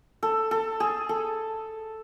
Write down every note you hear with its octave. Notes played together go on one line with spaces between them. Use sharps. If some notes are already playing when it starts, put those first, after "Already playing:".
A4
A4
G#4
A4